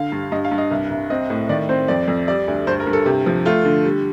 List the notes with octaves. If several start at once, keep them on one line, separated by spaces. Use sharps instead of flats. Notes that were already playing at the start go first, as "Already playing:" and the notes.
Already playing: D3 F5
G2
G2 D#5
F5
G2
D#5
C2
C2
C4 D#5
A2
D#3 D5
C4 C5
F2 D5
F2
G3 D5
D2
G2 C5
A#4
G2
A4
C3 G4
F3
A3 F4
D3
G3